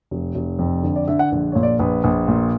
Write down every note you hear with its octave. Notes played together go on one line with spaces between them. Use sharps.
F1
F1
F2
D3
D5
D3 E5
F#5
A#1
A#2 C#5
D5
A#1 B4
A#1
A#2